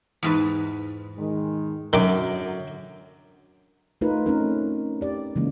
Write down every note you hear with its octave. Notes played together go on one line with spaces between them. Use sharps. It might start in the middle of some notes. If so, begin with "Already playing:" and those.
E2 G#2 B4
D#3 G#3
F#2 D3 D#3 F#3 D6
A3 D#4 F4 A#4 B4
A3 C4 C#4 D#4 A#4
G4 D5
C#3 E3 G#3 A#3